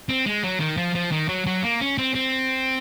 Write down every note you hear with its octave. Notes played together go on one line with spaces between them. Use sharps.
C4
G#3
F#3
D#3
F3
F3
D#3
F#3
F#3
A#3
C#4
C4
C4